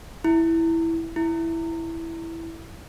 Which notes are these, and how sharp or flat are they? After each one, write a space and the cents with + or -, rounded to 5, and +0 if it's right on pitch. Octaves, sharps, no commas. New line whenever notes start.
E4 -5
E4 +0